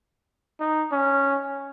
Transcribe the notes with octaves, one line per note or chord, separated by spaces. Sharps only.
D#4
C#4